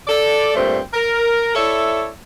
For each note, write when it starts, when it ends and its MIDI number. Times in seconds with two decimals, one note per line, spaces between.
0.08 0.54 69
0.08 0.54 74
0.56 0.79 43
0.56 0.79 46
0.56 0.79 57
0.56 0.79 60
0.56 0.79 72
0.93 1.52 70
1.55 2.07 64
1.55 2.07 69
1.55 2.07 73
1.55 2.07 74
1.55 2.07 76